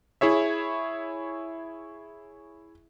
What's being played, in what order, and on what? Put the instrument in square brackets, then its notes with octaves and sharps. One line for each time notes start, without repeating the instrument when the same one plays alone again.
[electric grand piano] E4 G#4 C#5 E5